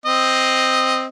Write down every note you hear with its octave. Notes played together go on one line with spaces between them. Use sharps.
C4 D#5